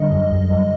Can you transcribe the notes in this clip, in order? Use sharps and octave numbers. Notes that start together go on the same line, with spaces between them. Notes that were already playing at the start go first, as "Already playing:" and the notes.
Already playing: D3 G3 D#5
F#2
F#2
F#2